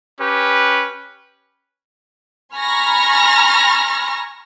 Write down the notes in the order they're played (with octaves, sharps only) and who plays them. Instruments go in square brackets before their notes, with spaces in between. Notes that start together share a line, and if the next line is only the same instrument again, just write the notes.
[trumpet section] C#4 G4 B4
[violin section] G#5 A#5 B5 C#6 F6 A#6